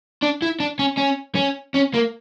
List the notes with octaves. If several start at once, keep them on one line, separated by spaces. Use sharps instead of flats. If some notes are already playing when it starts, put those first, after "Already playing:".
D4
E4
D4
C#4
C#4
C#4
C#4
A#3